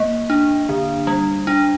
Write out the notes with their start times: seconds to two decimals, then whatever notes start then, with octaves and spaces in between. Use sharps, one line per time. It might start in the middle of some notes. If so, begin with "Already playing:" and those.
Already playing: A#3
0.30 D4
0.69 D3
1.07 G3
1.47 D4